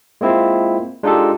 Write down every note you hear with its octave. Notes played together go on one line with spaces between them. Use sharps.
G#3 A#3 C4 E4 F4
G#3 D4 D#4 F4 G4 A4